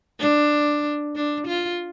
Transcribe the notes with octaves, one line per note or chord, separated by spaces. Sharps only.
D4
D4
F4